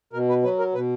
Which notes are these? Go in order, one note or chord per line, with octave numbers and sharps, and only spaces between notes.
B2 A#4
B4
F#3 B4
A#4
B2 B4